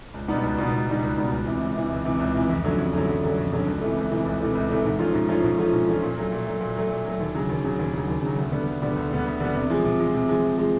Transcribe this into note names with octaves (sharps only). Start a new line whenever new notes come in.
C#2
B2 G3 B3 D#4
C#2
B2 G3 B3 D#4
C#2
B2 G3 B3 D#4
C#2
B2 G3 B3 D#4
C#2
C3 E3
C#2
C3 E3
C#2
C3 E3
C#2
C3 E3
F2
D3 F#3 A3 C#4
F2
D3 F#3 A3 C#4
F2
D3 F#3 A3 C#4
F2
D3 F#3 A3 C#4
C#2
C3 E3 A3
C#2
C3 E3 A3
C#2
C3 E3 A3
C#2
C3 E3 A3
G#2
F3 A3 C#4 F4
G#2
F3 A3 C#4 F4
G#2
F3 A3 C#4 F4
G#2
F3 A3 C#4 F4
A#2
F#3 A3
A#2
F#3 A3
A#2
F#3 A3
A#2
F#3 A3
D#2
C#3 F#3
D#2
C#3 F#3
D#2
C#3 F#3
D#2
C#3 F#3
D2
D3 G3 B3
D2
D3 G3 B3
D2
D3 G3 B3
D2
D3 G3 B3
C3
F3 G#3
C3
F3 G#3
C3
F3 G#3
C3
F3 G#3